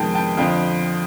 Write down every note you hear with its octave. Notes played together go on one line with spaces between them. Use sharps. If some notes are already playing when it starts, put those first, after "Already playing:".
Already playing: F2 C3 D#3 G#3 B3 G5 A5
G5 A5
F2 D3 F3 F5 G5